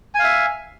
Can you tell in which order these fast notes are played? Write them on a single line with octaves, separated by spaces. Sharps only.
G#5 F5 E5